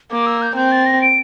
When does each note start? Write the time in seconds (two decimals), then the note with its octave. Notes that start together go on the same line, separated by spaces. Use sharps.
0.11 A#3 D6
0.26 E6
0.42 G6
0.56 C4 G6
0.72 A6
0.86 A#6
1.02 D7